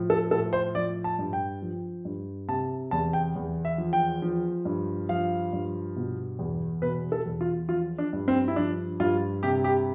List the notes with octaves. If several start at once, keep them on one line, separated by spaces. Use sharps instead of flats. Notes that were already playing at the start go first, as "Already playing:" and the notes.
Already playing: A2 F3
A4
A2 A4
C5
F3 D5
A5
G2
G5
F3
G2
C3 A5
E2 A5
G5
E2
E5
F3
G5
F3
G2
F3 F5
G2
B2
E2
B2 B4
A4
E2
F4
F3 F4
D4
G2
C4
E4
F3 D4
G2 F4
C3 G4
G4